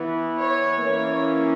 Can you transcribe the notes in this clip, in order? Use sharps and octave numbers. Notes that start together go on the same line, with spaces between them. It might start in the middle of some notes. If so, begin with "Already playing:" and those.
Already playing: E3 B3
C#5
E3 A#3 C#4 C#5